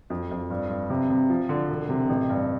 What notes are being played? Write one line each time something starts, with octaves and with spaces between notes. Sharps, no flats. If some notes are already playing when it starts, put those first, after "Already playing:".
F2
F2
G2
G2
C3
C3
F3
D3
E1
C3
A1
G2